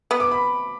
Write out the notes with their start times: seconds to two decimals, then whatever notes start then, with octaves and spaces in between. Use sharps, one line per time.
0.11 B3
0.20 D6
0.31 B5